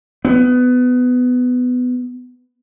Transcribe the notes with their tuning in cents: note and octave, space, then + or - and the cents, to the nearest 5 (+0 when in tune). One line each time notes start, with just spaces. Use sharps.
B3 +15